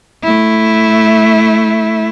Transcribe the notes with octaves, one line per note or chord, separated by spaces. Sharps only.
A3 E4